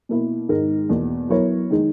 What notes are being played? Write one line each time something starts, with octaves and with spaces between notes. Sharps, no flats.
B2 A#3 E4
G#2 D#3 G#3 D#4 A#4
E2 B2 A#3
F#3 B3 E4 A#4 C#5
D#3 G#3 D#4